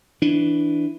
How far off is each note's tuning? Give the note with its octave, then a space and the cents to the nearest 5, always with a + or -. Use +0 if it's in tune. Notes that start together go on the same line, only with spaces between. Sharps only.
E3 +0 D4 +0